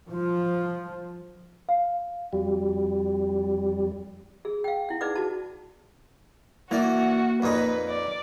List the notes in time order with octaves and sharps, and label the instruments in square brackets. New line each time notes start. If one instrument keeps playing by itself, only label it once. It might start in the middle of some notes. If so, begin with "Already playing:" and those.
[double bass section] F3
[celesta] F5
[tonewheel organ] F2 G3 [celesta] F#4
[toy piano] G#4
F5 G5
E4 F#5
D#4 G#4 B4 D5 F#5 D6
F#4 A5
[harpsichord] E3 D5 [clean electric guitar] A#3 [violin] F#4
[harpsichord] F2 A#2 D#4 [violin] B4
[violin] D5